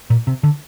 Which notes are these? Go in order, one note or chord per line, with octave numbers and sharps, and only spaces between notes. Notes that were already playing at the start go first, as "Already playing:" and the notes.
A#2
C3
D3